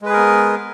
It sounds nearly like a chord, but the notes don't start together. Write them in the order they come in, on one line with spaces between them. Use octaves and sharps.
G#3 B4 G#4 A#4 B3